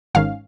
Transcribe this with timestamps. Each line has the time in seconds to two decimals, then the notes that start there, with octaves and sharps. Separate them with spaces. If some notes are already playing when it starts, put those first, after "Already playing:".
0.14 G#1 G#2 D#3 C#4 F5